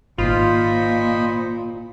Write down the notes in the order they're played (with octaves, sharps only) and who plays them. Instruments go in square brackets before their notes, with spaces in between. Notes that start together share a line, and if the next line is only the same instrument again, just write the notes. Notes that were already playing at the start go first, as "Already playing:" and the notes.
[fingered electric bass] G#1 [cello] A#2 [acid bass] F4 [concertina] C5 D#5 B5